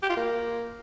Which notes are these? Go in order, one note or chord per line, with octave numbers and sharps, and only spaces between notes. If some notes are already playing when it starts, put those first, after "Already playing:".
G4
F4
A#3